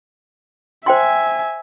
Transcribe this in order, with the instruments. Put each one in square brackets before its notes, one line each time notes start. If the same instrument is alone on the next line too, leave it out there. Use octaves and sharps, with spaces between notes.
[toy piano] C5 G5 C6 [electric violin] E5 G#5